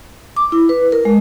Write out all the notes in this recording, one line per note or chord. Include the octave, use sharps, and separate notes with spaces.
D6
E4
B4
A#4
G#3